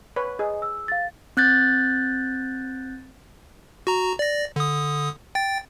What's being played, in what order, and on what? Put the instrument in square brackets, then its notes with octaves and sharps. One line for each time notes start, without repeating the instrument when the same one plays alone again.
[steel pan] B4 C#5
[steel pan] G#4 [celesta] D#5
[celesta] E6
F5 A6
[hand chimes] C4 F#6 G6 A6
[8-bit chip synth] F#4 A#5
D5 A#6
D3 D#6
G5 A6